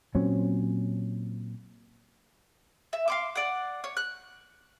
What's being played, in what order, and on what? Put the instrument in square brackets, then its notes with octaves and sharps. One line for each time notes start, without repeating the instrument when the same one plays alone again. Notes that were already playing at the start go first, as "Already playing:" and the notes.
[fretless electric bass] A#2 F#3 C4 C#4
[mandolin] E5
F5 C6 D6
D5 F#5
C#5
F#6